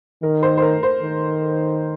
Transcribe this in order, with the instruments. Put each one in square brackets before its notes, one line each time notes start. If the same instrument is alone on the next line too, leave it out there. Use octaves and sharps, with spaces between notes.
[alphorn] D#3 [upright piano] A#4
[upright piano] C5
C5
A#4
C5
[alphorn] D#3